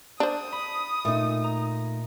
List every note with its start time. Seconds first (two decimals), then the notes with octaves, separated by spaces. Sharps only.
0.20 D4 C5 D#6
0.52 B5
1.05 A#2 A3 D#4
1.44 A#5